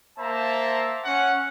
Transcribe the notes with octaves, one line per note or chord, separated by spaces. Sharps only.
A#3 C5 E5 A5 A#5
C#4 F#5